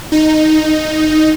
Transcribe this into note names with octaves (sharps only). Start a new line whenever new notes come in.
D#4